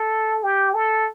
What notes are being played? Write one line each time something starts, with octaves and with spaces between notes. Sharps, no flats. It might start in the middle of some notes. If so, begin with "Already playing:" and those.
Already playing: A4
G4
A4